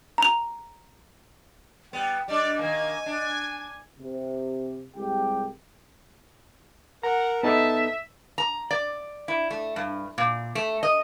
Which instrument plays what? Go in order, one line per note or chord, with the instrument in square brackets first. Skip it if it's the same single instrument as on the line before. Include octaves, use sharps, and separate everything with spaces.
[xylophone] A#5 F7
[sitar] G3 B3 [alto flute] G5
[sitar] G3 D4 [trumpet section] D5 [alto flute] D#5
[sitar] D#3 A#3 [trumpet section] G#5
[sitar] D4
[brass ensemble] C3
C2 G#3 G4 G5
[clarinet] A#4 [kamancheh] F#5 [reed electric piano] A#5
[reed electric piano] B3 D#4 A4 [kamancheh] E5 [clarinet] A5
[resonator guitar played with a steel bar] A#5
D5
E4
A3
G2
A#2
A3
D#5